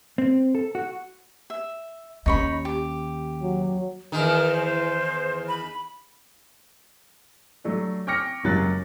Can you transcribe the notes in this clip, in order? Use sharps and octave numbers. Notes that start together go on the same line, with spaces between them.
C4
A4
F#4
E5
D#2 C#4 D#4 C#5 B5
G4
F#3
E2 D#3 A#4
C5
B5
F#3 A3 D4
G5 C#6 D6 F6 A#6 C#7
F#1 C#2 F#3 F#6 A6